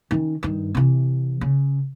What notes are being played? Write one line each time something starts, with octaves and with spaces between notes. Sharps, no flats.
D#3 C#4
G2 D#3
C3 E3
C#3